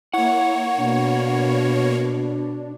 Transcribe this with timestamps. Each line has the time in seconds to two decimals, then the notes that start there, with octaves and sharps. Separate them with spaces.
0.14 A#3 E4 C#5 F#5
0.79 B2 D4